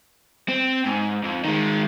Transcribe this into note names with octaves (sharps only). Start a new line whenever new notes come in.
C4
G#2
F2
D#3 G#3